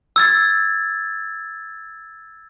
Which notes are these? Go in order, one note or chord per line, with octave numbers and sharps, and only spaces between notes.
E6 G#6 A6